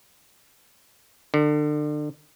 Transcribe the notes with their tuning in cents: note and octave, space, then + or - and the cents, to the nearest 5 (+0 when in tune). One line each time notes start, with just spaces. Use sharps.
D3 +30